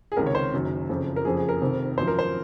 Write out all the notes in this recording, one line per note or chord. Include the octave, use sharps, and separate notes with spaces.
G#4
C#2 C3 D#3 A#4
C#5
C5
F#1 F#2 D#3
F#1 F2 C#3 F3
A#4
F#1 F2 C#3 F3 G#4
G#4
A#4
F1 F2 C3 D#3
G#1 F#2 F3 C5
A#4
C5